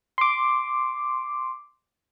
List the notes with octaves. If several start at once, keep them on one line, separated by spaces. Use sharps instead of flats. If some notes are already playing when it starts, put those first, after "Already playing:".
C6 D6